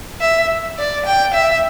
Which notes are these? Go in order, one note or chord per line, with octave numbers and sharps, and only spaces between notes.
E5
D5
G5
E5